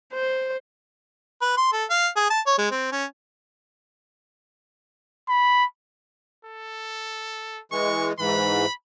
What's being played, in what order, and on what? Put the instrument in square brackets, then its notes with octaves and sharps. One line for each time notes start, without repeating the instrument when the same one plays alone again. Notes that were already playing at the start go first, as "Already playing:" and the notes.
[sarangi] C5
[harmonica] B4
C6
A4
F5
G#4
A5
C#5
G#3
C4
C#4
[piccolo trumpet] B5
[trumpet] A4
[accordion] E3 G#3 [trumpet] C#6
[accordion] G#2 E3 [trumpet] B5